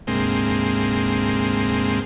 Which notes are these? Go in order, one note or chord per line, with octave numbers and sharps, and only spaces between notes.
D2 G#2 C3 G#3 A#3 C4